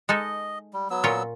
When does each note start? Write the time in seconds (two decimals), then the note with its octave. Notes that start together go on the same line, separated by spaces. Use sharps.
0.09 G#3 D#4 A4 D#5
0.73 G3
0.90 F#3 B3 E6
1.04 A#2 F4 C#5